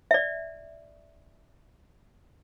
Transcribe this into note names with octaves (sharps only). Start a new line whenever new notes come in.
D5 E5